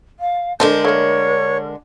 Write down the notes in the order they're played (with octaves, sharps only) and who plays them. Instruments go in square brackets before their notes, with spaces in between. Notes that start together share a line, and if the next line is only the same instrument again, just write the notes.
[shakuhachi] F5
[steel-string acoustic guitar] D3 G#3 D4 [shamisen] A3 C5 A5 [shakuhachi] A#4 [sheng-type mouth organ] G6
[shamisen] A3 A#3 [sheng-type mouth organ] C#5